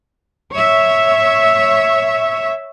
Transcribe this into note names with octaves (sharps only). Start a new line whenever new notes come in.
C#5 E5